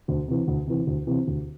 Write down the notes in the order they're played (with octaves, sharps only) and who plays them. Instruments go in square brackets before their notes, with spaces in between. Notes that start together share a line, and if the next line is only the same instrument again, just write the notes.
[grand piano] D2
C3 E3
D2
C3 E3
D2
C3 E3
D2